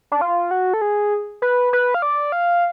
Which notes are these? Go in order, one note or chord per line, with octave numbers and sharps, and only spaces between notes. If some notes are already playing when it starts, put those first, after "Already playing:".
D4
F4
F#4
A4
G#4
B4
B4
F5
D5
F5